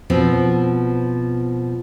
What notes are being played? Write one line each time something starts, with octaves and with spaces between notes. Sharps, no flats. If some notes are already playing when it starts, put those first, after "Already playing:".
B2 F3 B3 C4